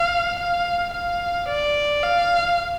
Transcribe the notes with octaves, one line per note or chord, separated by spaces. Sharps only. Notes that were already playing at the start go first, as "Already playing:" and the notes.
Already playing: F5
F5
F5
D5
F5